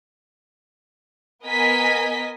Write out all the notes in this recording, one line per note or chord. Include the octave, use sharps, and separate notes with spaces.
B3 A#4 D#5 G#5 B6